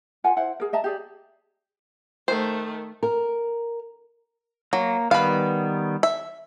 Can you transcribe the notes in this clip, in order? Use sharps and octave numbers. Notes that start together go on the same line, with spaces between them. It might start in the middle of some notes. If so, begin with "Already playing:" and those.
F4 A#4 F#5 G#5
E4 C5 F#5
G#4 A#4
D#5 E5 A5 A#5
G4 G#4 D5
D#3 A3 C5
A#4
F#3 A#3
D#3 G3 B3 B4 F5
E5